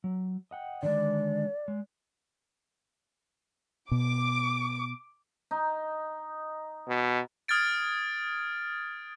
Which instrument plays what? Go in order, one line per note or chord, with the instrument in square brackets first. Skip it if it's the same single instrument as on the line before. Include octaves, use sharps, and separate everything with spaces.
[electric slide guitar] F#3
D#5 F#5 G5
[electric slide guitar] D3 D#3 G#3 [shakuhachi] D5
[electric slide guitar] G#3
[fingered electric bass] B2 [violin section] D6
[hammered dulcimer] D#4
[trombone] B2
[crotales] D#6 F6 G#6 A6 D7